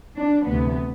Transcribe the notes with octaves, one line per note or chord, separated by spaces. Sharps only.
D4
D2 C3 E3 B3